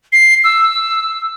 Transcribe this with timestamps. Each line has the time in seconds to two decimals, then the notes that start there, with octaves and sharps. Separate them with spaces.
0.12 C7
0.44 E6